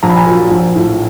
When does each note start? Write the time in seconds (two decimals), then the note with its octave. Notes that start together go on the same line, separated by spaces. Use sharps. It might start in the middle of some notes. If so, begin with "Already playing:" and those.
0.03 A#1 A#5
0.09 B5
0.16 G#5 A#5
0.27 A#2 F#3
0.51 A#1
0.76 A2 F3